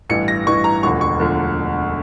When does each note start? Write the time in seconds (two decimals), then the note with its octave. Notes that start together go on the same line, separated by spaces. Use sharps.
0.10 A1 G2 E3 C#7
0.28 A#6
0.46 A1 G2 E3 C#6
0.64 A#5
0.83 E1 D2 D3 F3 C#6
1.01 C#6
1.19 E1 D2 D3 F3